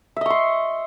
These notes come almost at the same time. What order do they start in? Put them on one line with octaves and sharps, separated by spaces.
E5 D#5 C#6 C6